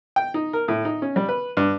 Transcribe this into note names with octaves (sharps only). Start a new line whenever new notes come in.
G5
D#4
A#4
A2
D#4
C#4
G3
B4
G2